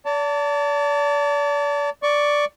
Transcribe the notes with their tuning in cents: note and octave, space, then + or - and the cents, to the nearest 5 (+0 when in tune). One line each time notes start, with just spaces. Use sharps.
D5 -35 A5 +25
D5 +0 C#6 +10